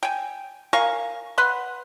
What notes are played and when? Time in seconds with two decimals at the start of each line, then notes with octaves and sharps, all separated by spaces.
0.03 G5 G#5
0.73 A#4 F5 G#5 C#6
1.38 B4 F#5 C6